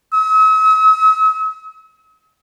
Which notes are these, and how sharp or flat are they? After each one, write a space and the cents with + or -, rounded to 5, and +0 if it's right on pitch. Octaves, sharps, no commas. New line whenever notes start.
E6 -45